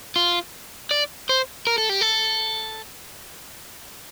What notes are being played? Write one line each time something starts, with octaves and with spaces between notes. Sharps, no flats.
F4
D5
C5
A#4
A4
G4
A4